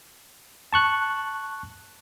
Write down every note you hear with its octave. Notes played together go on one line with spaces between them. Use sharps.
A5 C#6 F#6